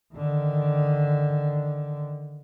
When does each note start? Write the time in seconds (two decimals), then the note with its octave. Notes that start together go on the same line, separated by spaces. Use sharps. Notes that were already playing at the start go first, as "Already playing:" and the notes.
0.14 D3 D#3